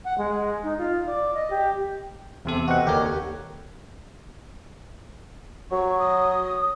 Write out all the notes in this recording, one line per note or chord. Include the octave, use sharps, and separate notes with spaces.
F#5
G#3
D#4
F4
D5
D#5
G4
E2 C3 A4
C4 F#4 B4 D#5 F#5
D#2 D3 G4 A#4 C#5
F#3 C#6
D#6